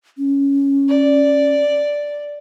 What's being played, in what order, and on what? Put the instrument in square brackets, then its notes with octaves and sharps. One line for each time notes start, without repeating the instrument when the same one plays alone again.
[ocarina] C#4
[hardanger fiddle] D5